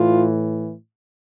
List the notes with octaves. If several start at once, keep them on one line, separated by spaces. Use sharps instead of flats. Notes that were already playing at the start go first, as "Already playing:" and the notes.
Already playing: A2 E3 F4